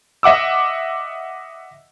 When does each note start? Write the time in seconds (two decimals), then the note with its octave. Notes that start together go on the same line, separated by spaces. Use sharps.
0.23 D#5 E5 F#5 D6 E6